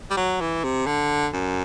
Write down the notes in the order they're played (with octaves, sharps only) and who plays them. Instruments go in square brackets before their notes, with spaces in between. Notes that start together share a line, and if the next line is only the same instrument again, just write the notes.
[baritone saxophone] G3
F#3
E3
C3
D3
F#2